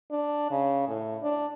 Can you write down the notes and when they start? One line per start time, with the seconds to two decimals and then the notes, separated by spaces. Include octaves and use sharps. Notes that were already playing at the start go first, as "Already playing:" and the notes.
0.11 D4
0.51 C#3
0.88 A2
1.23 D4